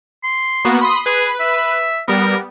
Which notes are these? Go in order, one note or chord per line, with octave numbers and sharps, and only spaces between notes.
C6
A#3 B3 F#4
B5 C6 D#6
G#4 B4
E5
G3 B3 A#4